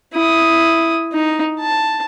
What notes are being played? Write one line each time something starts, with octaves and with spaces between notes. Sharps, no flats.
E4 D#6
D#4
A5